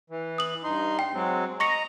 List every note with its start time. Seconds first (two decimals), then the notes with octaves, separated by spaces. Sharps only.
0.10 E3
0.38 D#6 F#7
0.64 G2 D#4 C6
0.99 G5
1.14 F#3 G#3 C4
1.60 D#5 A#5 C#6 A#6 C#7